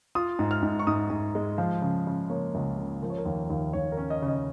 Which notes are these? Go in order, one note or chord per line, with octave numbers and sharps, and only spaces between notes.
F4 D#6
G#2
F6
G#2
C#6
G#2 D#6
G#2
G#3
F3 F5
C#3
C#3
A#3 C#5
C#2
C#3
F3 A#4
C#5
A#4
D#2
D#2
D#2 C#5
A#4
C#4
D#5
C#3
D#5